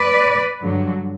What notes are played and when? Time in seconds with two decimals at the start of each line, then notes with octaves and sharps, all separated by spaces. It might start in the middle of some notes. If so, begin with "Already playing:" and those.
Already playing: B4 D5
0.61 G2 D3 F#3